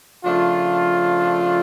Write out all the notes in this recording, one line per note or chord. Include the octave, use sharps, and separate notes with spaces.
C#3 F3 A3 D4 F4